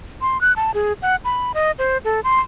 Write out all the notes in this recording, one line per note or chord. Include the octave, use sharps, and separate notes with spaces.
C6
F#6
A5
G#4
F#5
B5
D#5
C5
A4
C6